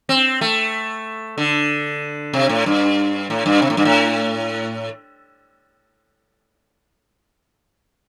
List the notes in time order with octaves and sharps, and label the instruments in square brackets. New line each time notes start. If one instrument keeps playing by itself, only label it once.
[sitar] C4
A3
D3
C3
A2
G2
A2
G2
C3
A2
G2
A2